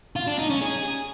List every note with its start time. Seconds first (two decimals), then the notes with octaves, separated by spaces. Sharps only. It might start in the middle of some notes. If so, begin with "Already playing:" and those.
0.16 F4
0.27 D4
0.38 D#4
0.50 C#4
0.61 G#4